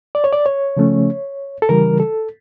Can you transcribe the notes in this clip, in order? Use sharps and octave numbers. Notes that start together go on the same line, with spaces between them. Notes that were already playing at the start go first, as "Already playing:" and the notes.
D5
C#5
D5
C#5
C#3 F3 A3 C#4
A4
C#3 E3 G3 A#4
A4